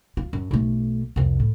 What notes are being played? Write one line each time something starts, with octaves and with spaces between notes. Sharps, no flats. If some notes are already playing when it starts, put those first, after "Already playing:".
F4
F#2
B1 A3
C2 F2
A2